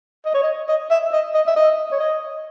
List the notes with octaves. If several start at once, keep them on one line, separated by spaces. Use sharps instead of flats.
D#5
C#5
D#5
D#5
E5
D#5
D#5
E5
D#5
C#5
D#5